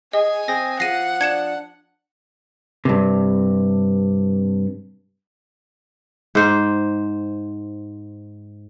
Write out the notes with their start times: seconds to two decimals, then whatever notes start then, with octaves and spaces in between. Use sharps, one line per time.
0.13 G#4 D#5 G#5
0.48 C4 G#4 A#6
0.80 F3 F#5 A#6 C7 D#7
1.21 D4 G#6 C#7 E7
2.85 G2 C3
6.35 G#2 C5